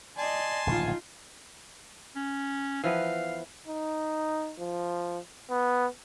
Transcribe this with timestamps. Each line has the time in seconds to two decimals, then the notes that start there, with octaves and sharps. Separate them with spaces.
0.17 D5 D#5 G#5 A5 C6
0.67 D1 A#1 C#3 D#4 F4
2.16 C#4
2.84 E3 F3 B3 F5
3.67 D#4
4.59 F3
5.50 B3